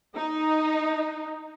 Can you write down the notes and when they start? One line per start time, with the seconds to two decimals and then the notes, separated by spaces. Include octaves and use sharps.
0.15 D#4